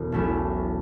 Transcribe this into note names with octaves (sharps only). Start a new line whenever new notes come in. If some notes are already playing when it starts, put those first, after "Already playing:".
Already playing: E1
B1 B2 A3 C#4 E4